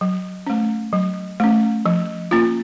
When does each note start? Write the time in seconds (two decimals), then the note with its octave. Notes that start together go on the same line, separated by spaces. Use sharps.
0.01 F#3
0.47 A3 C#4
0.93 F#3
1.40 A3 C#4
1.86 F3
2.31 A#3 C#4 F4